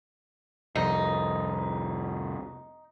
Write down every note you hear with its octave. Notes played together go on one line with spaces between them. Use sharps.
C2 F2 D#4